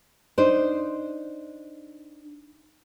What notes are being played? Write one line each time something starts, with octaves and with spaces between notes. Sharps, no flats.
D4 D#4 C5